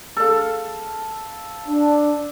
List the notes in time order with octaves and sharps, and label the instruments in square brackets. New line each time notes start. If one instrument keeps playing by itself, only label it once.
[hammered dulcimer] A4 F5
[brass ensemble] D4